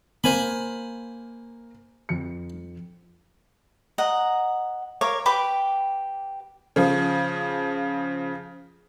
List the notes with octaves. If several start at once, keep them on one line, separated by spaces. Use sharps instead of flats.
A#3 C5 G#5 B5
F2 C#7
D#5 F#5 A#5
A#4 C#5 F5 D6
G4 B4 G5 D6
C#3 F3